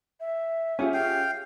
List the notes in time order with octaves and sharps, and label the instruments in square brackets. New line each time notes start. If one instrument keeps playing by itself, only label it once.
[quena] E5
[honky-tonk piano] C#4 G4 G#4 [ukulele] F4 F#5 G#5
[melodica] F5 G5